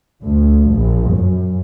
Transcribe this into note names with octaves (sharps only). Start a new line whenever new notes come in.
D2
A#1
F#2